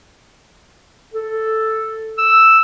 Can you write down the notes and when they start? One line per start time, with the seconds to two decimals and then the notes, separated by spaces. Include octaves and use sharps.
1.14 A4
2.18 E6